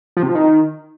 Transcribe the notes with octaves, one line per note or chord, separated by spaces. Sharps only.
F3
C3
F3
D#3